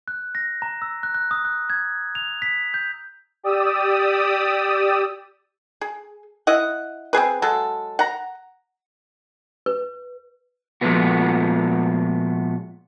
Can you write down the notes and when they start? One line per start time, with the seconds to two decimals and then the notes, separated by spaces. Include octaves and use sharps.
0.08 F#6
0.35 A#6
0.62 A#5
0.82 E6
1.03 F#6
1.14 F#6
1.31 D#6
1.45 F#6
1.70 G#6
2.15 F7
2.42 B6
2.74 G6
3.43 G4 D5 D#6 E6
5.81 G#4
6.47 E4 D#5 F#5
7.13 C4 G4 G#4 B4
7.42 F#3 G#3 A4
7.99 F#5 A#5
9.66 B4
10.81 A#2 F3 G#3 A3 B3 F#4